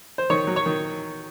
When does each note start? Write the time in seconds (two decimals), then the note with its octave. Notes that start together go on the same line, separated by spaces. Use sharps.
0.18 C5
0.30 D#3 C#5
0.47 F#3
0.56 C#5
0.66 D#3